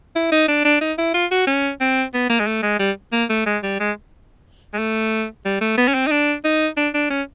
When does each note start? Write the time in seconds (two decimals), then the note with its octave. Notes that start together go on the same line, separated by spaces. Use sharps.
0.15 E4
0.32 D#4
0.48 D4
0.65 D4
0.81 D#4
0.98 E4
1.14 F4
1.31 F#4
1.47 C#4
1.80 C4
2.14 B3
2.30 A#3
2.40 G#3
2.47 A3
2.63 G#3
2.79 G3
3.13 A#3
3.30 A3
3.46 G#3
3.63 G3
3.80 G#3
4.73 G#3
4.78 A3
5.45 G3
5.61 A3
5.77 B3
5.88 C#4
5.95 C4
6.07 D#4
6.11 D4
6.44 D#4
6.77 D4
6.94 D4
7.10 C#4